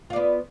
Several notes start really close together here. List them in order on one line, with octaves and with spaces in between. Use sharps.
F4 D5 B3